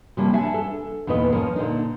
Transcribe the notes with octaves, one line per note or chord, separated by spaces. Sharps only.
C3 F3 G3 A#3 C#4
D4 E5 F#5 G#5
A4
E2 A#2 D#3 B4 D#5
F3 C#4 A#4
A#2 D3 D4 D#4